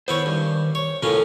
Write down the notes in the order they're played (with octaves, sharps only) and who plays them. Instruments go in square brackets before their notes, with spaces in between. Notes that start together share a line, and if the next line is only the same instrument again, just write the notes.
[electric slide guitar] D#3 C5 [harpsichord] B3 E4 C#5
[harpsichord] G2
C#5
[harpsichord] F#2 A2 C#4 [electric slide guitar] C3 F4 A#4